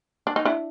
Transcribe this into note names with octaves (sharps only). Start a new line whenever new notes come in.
D4
D#4
D4 E4